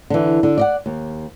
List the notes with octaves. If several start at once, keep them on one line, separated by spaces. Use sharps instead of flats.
D3 E3
D3
D5 D#5 F#5
D#2